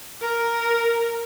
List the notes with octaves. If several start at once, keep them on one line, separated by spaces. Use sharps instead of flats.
A#4